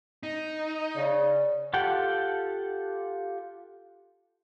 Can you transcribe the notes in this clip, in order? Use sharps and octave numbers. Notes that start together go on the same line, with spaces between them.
D#4
C#3 D5
F4 G4 A4 F#5 G5